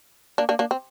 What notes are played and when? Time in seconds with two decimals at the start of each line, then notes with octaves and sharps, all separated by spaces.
0.38 A#3 D4
0.49 A#3 D4
0.59 A#3 D4
0.71 C4